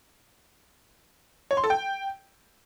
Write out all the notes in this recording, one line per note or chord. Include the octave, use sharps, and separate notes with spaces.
C#5
C6
A4
G5